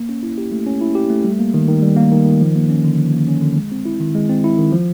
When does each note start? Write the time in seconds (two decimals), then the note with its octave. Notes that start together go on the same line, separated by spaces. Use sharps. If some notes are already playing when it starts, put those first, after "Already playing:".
Already playing: A#3
0.09 C#4
0.23 E4
0.38 G4
0.52 A3
0.67 C#4
0.81 E4
0.95 G4
1.10 A3
1.24 G3
1.39 A#3
1.54 D#3
1.68 D#3
1.83 G3
1.97 A#3
2.12 D#3
2.26 D#3
2.41 F3
2.55 A#3
2.70 C#4
2.84 D3
2.99 F3
3.13 A#3
3.28 C#4
3.42 D3
3.56 G#3
3.72 C4
3.85 E4
4.00 D#3
4.15 G#3
4.29 C4
4.44 E4
4.58 D#3
4.72 F3